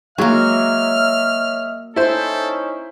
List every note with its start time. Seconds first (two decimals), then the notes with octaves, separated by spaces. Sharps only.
0.18 F#3 G#3 A#3 F#4 C#5 D#5 E5 F6
1.96 C#4 D#4 E4 A4 C5